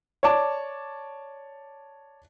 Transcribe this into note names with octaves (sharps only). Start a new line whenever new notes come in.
C#5 D5 A5 D6